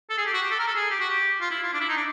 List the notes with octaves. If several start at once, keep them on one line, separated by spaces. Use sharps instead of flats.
A4
G#4
G4
F#4
G4
A4
A#4
A4
G#4
G4
F#4
G4
F4
E4
F4
D4
E4
D#4
D4